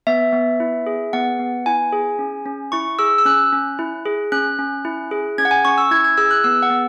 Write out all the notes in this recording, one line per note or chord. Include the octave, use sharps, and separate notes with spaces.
B3 E5
B3
E4
G#4
B3 F#5
B3
E4 G#5
G#4
C#4
C#4
E4 C#6
G#4 E6
E6
C#4 F#6
C#4
E4
G#4
C#4 F#6
C#4
E4
G#4
C#4 G#6
F#5
G#5
C#4 C#6
E6
E4 G#6
G#6
G#4 E6
F#6
B3 E6
F#5
B3